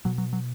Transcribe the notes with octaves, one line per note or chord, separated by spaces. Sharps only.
B2 F#3
F#3
F#3